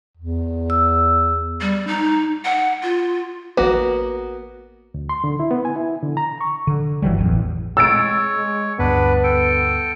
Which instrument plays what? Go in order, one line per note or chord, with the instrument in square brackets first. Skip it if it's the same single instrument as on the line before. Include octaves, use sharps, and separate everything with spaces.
[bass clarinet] E2
[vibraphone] E6
[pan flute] G3
D#4
F#5
F4
[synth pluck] A1 B4 [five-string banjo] A#3 B3 F#4
[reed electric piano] D2
C6
D3
E4
B3
G#5
E4
D3
A#5
C#6
[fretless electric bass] D3
G1 E3 F#3 G3
A1 E2
[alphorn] G#3 [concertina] C#5 [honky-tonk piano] E6 A6 D7
[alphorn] G#3
[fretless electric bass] D2 G2 [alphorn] B3 [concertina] D4 B4
[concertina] A4 G5